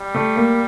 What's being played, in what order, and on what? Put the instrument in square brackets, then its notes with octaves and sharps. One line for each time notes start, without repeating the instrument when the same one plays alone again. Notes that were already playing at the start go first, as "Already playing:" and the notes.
Already playing: [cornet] G3
[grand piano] A3
A#3